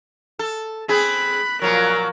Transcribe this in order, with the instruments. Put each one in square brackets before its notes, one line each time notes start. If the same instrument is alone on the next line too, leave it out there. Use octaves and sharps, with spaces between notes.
[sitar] A4
[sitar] C4 G#4 [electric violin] B5 F#6
[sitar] A#2 F3 F#3 [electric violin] A#4